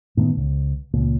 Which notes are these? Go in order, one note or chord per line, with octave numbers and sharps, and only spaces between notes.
A2 D#3 A#3 B3
C#2
C#2 A#2